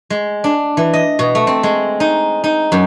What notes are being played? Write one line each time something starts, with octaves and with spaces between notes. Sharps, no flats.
G#3
D4
E3
D#5
B2
A3
C4
G#3
D#4
D#4
F#2